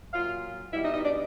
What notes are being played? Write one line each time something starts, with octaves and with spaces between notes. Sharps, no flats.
A#2 F#3 F4 F5
E2 B2 G3 E4 E5
D#4 D#5
D#4 D#5
D4 D5